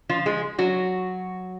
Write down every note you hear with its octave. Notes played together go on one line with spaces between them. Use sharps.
F3 F4
G#3 G#4
F#3 F#4